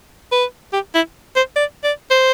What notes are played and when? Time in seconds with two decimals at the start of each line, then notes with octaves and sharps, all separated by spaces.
0.32 B4
0.73 G4
0.95 E4
1.36 C5
1.56 D5
1.84 D5
2.11 C5